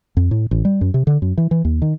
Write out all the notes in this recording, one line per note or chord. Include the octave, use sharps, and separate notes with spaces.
F2
A2
A1
G3
F#2
C3
D3
F#2
E3
E3
D#2
D#3